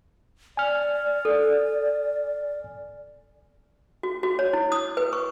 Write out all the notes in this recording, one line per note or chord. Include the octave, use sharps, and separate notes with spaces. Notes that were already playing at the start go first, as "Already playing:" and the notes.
D5 G#5 F6
A4
F#4
F#4
C#5
E4
D#6
B4
C#6